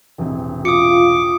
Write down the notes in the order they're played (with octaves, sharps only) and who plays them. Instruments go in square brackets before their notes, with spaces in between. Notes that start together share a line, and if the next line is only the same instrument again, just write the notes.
[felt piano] E1 A1 C3
[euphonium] F4 [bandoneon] D6 [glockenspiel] D#6 C#7